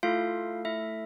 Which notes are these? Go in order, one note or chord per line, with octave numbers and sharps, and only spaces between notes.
A3 E4 F4 A4 F5
E4 E5